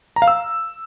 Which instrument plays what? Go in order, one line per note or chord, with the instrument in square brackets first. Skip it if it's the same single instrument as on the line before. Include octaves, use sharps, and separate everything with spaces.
[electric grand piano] A#5
F5
E6